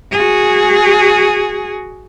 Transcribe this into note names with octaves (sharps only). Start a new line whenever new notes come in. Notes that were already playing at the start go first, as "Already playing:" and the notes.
F#4 G#4